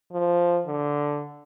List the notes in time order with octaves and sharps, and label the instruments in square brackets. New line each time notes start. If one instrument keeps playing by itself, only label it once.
[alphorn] F3
D3